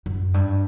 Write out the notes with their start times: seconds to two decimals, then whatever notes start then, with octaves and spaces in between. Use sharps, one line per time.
0.06 F#2
0.34 G2